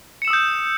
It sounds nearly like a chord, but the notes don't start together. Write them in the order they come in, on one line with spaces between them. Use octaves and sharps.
C#7 E7 E6 D#6 G6